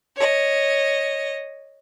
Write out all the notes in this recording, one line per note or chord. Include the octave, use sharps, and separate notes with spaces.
C#5 D#5